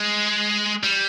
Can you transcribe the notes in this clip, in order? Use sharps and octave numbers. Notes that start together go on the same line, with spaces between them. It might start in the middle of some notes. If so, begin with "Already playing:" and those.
Already playing: G#3
G3